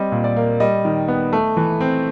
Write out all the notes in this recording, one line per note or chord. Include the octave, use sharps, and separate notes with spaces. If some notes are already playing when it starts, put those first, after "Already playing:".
Already playing: G3 C4 D#5
A#2
D5
A#3
G3 D#5
D#3
B3
A3
E3
C4